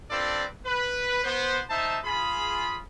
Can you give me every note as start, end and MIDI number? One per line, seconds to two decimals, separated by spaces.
0.11 0.45 60
0.11 0.45 62
0.11 0.45 65
0.11 0.45 69
0.11 0.45 71
0.11 0.45 74
0.65 1.22 71
1.24 1.61 59
1.24 1.61 72
1.70 1.98 63
1.70 1.98 72
1.70 1.98 76
1.70 1.98 81
2.05 2.80 65
2.05 2.80 68
2.05 2.80 83